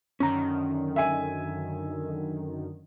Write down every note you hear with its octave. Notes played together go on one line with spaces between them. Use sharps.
F#2 D3 D#3 C#4 A#5
E5 G#5